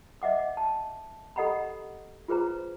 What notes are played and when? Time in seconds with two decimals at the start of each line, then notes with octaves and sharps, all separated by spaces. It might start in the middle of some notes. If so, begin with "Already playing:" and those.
0.22 D#5 E5 F#5 D6
0.57 A5
1.36 G4 A4 D#5 F#5 A#5 B5
2.28 F4 G#4 B4 C5 A#5